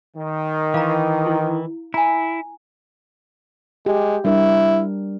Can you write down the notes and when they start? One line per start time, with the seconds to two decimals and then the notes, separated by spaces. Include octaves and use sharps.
0.17 D#3
0.74 E3 F5 A#5
1.27 E4
1.94 E4 G#5 A#5
3.86 G#3 G4
4.25 G3 D4 E4 A#4